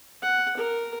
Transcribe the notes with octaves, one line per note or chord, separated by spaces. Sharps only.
F#5
A#4